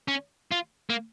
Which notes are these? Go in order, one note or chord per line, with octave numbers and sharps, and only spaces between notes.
C#4
F4
A#3